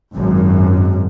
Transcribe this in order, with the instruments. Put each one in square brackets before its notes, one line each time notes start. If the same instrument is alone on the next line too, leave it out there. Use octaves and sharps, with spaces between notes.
[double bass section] G#1 F#2